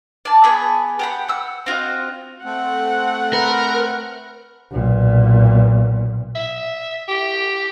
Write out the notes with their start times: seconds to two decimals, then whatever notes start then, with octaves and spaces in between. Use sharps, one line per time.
0.25 D5 A5
0.44 B3 G#4 B5
0.99 G4 F#5 B5
1.28 F#5 E6
1.66 C4 F4 F#4 D#5
2.45 A3 C4 F#5
3.33 A#4 B4
4.72 B1 A#2
6.35 E5
7.08 G4